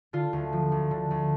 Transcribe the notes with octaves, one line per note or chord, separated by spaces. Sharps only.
D3 F4
D2
F3
D2
D3
D2